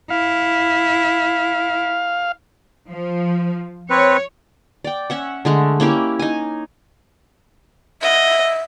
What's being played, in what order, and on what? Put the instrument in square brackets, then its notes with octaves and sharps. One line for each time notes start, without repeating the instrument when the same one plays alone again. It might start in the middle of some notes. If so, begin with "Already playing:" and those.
[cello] E4 [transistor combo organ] F5
[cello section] F3
[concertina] C4 B4 [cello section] C#5
[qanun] D5 G5
C#4 E5 F#5
D3 G#3 A3
A#3 C#4 E4 G4
D#4 G#5
[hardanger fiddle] D#5 F#5 [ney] E5